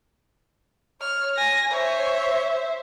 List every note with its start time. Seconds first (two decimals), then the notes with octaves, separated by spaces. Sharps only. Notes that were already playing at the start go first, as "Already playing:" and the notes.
1.01 C#5 F6
1.37 G#5 A#6
1.71 C5 C#5 E5